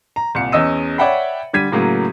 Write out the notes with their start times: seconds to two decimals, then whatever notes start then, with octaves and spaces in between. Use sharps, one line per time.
0.16 A#5
0.35 C2 A#2 C#7
0.52 E2 C#4 D#5 E6 D#7
0.98 C#5 D5 E5 F#5 G5 B5
1.53 D3 G3 G#6 B6 D#7
1.72 A2 C#3 F#3 A#3